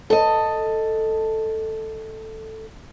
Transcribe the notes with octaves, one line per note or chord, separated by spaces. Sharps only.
A4 D#5